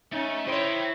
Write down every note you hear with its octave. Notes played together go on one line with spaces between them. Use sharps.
A3 C#4 D#4
E4 C5 C#5 D#5 G5